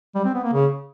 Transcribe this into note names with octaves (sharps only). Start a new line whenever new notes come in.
G3
C4
B3
A#3
C#3